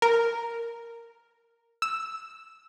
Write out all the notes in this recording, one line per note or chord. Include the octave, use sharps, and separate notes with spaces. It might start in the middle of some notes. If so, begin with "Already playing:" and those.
A#4
E6